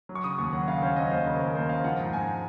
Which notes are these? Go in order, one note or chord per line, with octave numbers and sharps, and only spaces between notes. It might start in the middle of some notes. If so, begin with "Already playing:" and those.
F#3
C#6
C#3 D#6
D#2 C#6
F#3 F#5
C#3 F5
C#4 C5
F#3 D#5
D#2 C5
C#3 A#4
D#2 A#4
D#2 C5
C#3 F5
F3 F#5
G#2
A#5
G#2 G#5